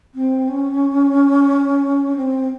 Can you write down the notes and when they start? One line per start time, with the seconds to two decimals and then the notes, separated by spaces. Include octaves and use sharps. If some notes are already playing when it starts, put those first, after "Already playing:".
0.14 C4
0.47 C#4
2.16 C4